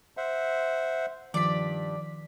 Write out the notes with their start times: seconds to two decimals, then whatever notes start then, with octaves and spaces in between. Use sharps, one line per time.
0.17 C5 E5 F#5
1.34 G2 D#3 F3 D5 B6